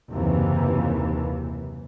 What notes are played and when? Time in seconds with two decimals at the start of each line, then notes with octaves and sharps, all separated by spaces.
0.10 F#1 D#2 C3 E3